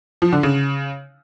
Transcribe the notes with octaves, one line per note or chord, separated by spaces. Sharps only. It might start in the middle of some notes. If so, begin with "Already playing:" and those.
F3
D3
C#3